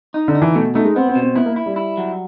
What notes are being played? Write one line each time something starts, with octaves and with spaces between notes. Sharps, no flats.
D#4
D3
D#4
E3
B2 A3
A3 D#4
G#3
B3 C4
C4
B2
C4
B3 E4
A#3
E4
G3
E4
F#3